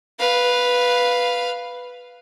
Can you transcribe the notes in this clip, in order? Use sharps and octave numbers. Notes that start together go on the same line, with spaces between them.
B4 F5